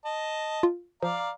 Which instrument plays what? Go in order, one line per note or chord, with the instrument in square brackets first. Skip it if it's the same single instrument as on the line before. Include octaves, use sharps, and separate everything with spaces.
[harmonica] D#5 A5
[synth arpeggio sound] F4
[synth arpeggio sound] F3 [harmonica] D5 F5 A#5